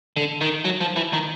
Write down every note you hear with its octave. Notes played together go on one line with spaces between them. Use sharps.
D3
D#3
F#3
F3
E3
D#3